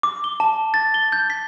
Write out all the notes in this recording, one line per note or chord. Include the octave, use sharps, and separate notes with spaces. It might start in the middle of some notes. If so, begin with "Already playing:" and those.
D6
G7
A5
A6
G7
G6
B6